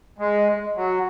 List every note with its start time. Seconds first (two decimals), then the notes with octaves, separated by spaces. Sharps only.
0.19 G#3
0.75 F#3